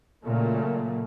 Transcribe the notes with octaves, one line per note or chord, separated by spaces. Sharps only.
A#2 C#3 F#3 A3 A#3